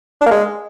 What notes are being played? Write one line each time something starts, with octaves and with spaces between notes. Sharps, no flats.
D4
A#3
G#3